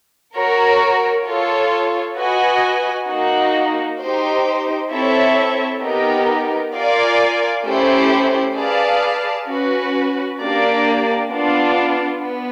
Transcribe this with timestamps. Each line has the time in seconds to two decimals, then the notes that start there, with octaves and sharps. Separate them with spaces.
0.34 F#4 A#4 C#5
1.26 F4 A4 C#5
2.17 F#4 B4 D#5 G#5
3.08 A#3 D#4 F#4
4.00 D#4 G4 C5
4.91 C4 E4 A4 C#5 E5
5.82 B3 D#4 G4 A#4
6.74 F4 A#4 D5 F5 G#5
7.65 A3 C#4 E4 G4 C5
8.57 G#4 B4 D5 F5 A5
9.48 C#4 F#4 B4
10.40 A#3 D4 G4 A#4 D5
11.31 B3 D4 F4
12.22 B3